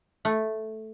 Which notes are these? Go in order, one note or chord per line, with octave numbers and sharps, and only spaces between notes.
A3